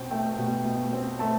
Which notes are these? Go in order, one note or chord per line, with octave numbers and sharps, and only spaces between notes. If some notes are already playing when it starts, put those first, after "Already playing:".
Already playing: B2 C4 G5
A3 G5
B2
B2
C4
A3 A5